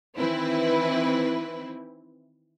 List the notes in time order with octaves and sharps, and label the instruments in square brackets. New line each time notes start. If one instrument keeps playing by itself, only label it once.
[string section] D#3 E3 C4 E4 B4